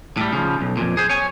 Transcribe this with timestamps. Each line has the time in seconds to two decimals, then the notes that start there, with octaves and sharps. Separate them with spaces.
0.17 A2 G3
0.33 C#3 F3
0.61 B1
0.77 F2 A#2
0.97 G#4 C5
1.09 C#5 G#5